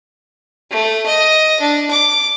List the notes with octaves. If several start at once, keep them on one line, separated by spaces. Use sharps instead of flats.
A3
D#5
D4
D6